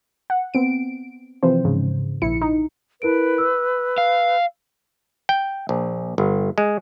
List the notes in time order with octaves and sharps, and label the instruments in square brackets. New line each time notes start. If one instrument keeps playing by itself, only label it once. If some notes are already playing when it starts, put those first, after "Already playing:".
[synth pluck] F#5
B3 C4 D7
C3 E3 F3 C4 C5
G#2 C#3
A#1 E4 C#7
D#4
[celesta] E4 A#4 D7 [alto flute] B4
[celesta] E6
[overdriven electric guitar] F5
[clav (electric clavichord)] G5
A#1
G1
G#3